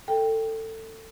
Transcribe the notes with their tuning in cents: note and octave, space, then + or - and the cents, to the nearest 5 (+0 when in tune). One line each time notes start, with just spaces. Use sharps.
A4 +20 G5 +0